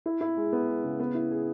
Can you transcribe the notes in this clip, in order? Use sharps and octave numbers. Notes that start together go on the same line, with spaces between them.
E4
E4
G#3
B3
G#3
C#3
B3
E4
G#4